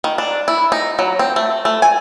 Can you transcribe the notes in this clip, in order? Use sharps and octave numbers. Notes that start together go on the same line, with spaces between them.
D#3
D4
E4
D#4
F#3
C4
A3
A3
G#5